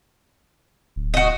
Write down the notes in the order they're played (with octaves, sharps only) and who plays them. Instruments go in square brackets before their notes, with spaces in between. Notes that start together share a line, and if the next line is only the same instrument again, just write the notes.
[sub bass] D1
[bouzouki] F#4 D#5